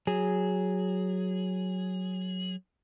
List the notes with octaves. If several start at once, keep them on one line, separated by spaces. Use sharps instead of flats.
F#3 G#4